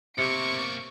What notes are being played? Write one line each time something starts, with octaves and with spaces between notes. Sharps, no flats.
B1 C3 A#3 C#6 C#7 D7